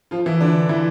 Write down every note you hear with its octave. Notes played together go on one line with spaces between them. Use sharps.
F3 F4
E3 E4
D3 D4
E3 E4